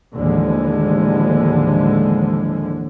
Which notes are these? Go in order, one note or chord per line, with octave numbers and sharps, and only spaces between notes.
D#2 A2 D3 E3 F3 G#3